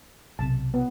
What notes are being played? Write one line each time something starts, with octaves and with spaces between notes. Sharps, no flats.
B1 C3 A5
B3